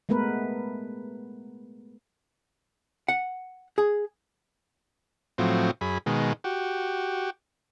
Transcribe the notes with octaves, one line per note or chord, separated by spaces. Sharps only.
G#3 A3 B3 A#4 B4
F#5
G#4
A2 F3 F#3 C4
F#2 G#4 B5
B2 D#3 G#3
F#4 G4